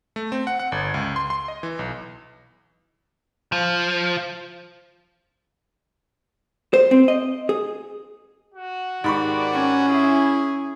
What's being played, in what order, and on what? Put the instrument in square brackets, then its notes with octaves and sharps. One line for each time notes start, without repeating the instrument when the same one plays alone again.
[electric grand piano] A3
C4
F#5
F#5
G1
C#2
C6
C6
D#5
E3
B1
[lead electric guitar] F3
[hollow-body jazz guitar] C5
C4
D#5
G#4
[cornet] F#4
[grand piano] G#2 B5 C#6 [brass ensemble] D#3 G4 D5
[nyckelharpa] C#4
[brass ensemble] E4 [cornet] G#4